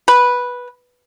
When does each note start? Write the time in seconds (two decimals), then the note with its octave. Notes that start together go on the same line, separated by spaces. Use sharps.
0.08 B4